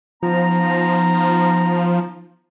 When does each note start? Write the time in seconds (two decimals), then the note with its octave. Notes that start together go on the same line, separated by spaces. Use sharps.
0.23 F3 B3 D#4 A#5